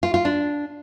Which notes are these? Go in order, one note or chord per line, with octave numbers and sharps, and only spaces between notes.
F4
F4
D4